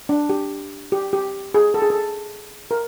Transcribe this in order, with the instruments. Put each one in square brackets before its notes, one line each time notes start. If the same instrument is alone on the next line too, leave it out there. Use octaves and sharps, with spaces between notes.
[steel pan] D4
G4
G4
G4
G#4
A4
G#4
A4
A#4